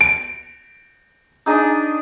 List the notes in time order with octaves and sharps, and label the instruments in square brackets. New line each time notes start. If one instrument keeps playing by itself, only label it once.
[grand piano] D7
[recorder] D4 [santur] D#4 G#4 D#5